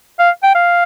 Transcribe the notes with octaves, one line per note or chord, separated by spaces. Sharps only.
F5
G5
F5